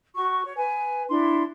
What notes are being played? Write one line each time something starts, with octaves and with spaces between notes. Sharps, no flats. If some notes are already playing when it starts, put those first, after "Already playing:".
F#4 C#6
C#5
B4 G#5
D4 E4 C6